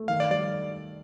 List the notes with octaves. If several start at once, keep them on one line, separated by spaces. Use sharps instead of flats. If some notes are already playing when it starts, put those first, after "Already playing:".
Already playing: A3
D#3 F5
D5
G3 D5